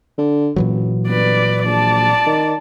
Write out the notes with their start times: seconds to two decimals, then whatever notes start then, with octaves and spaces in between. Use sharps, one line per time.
0.18 D3
0.56 F#1 A#2 E3 F#3
1.08 G1 B4 D5
1.65 A#1 D5 A5
2.26 D#3